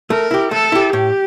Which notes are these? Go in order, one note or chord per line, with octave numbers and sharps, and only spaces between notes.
A3 A#4
E4 G4
A3 A4
E4 G4
A2 G4